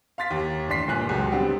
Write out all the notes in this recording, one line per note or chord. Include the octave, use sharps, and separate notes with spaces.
F5 C6 A6 B6
D#2
A1 D4 C6 B6 C7
G1 A#2 G#5 F#6
C#2 F#3
D3 G3 B3 C4